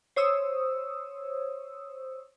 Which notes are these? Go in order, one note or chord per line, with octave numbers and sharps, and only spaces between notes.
C5 C#5 D#6 E6